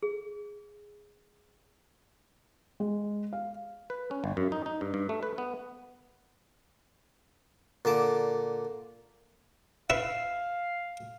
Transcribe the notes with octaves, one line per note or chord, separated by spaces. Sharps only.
G#4
G#3
F5
B4
C#4
G1
F#2
D#4
D#4
G2
G2
A3
B4
B3
A#2 D3 A5 D6
E4 B4 F5